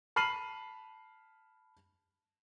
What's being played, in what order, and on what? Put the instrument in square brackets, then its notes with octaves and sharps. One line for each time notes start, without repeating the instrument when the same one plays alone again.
[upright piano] A5 B5 F6 C7 D#7 F#7